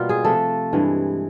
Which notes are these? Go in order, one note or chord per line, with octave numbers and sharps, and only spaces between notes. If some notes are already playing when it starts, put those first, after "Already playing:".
Already playing: B2 G3 A#3 F4
G#4
C3 F3 A3 A4
G2 E3 G#3